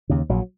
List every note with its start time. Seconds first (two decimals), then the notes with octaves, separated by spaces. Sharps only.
0.09 D#2 C#3
0.29 A#1 F#3